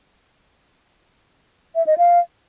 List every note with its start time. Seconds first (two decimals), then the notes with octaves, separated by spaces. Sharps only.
1.75 E5
1.87 D#5
1.98 F5